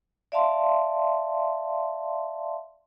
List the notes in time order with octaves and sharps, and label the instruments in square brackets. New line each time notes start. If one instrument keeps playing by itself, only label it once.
[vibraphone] D5 E5 F5 A5 C6